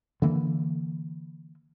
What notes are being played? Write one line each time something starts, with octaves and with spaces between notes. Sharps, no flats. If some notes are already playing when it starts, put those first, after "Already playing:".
D3 E3 A#3